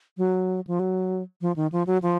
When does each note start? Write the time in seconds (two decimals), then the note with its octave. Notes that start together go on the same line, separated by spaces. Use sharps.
0.18 F#3
0.67 F3
0.80 F#3
1.41 F3
1.56 D#3
1.72 F3
1.87 F#3
2.02 F3